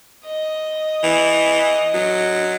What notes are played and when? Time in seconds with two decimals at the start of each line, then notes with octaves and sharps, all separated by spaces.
0.25 D#5
1.04 E3
1.94 F#3